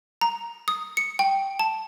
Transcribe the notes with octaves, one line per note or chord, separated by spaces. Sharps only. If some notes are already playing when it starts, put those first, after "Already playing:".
A#5
D#6
C#7
G5
A5